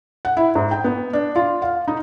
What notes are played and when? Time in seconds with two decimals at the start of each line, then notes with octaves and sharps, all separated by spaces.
0.25 F#5
0.37 E4
0.55 G#2
0.71 G5
0.84 B3
1.13 D4
1.36 F4
1.62 F5
1.88 D#4